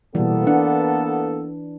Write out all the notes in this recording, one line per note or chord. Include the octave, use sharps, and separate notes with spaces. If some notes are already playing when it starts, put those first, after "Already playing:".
B2 E3 G3 A#3 B3 A4
D4 F#5